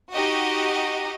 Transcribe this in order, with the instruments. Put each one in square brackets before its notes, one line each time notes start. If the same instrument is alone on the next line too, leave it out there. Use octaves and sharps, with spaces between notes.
[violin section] D#4 F#4 G4 D#5